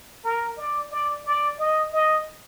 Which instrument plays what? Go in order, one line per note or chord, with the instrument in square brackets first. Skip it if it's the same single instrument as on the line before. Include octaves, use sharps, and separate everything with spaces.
[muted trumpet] A#4
D5
D5
D5
D#5
D#5